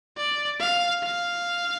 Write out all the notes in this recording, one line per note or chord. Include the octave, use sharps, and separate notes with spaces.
D5
F5
F5